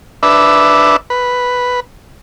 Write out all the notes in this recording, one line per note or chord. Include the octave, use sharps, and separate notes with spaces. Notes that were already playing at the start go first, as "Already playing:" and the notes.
D4 B4 E5
B4